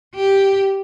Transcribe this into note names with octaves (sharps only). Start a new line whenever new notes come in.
G4